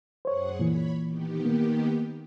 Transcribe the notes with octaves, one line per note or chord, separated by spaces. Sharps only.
F#2 G#4 C5 C#5 F#5
A#2 E3 C#5 B5
D#3 B3 G4
A#3